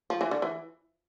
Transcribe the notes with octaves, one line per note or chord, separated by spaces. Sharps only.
F3
E3
D3
E3